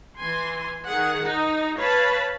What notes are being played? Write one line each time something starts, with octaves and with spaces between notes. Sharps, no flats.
E3 G#5 C6
D#3 G#4 F#5
D#4
B4 C#5 F5 A5 B5